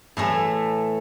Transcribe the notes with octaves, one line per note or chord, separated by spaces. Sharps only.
A2 E3 A3